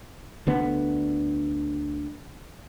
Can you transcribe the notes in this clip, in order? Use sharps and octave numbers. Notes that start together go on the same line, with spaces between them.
D2 D3 B3